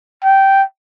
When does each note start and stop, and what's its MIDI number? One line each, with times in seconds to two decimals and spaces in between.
0.24 0.63 79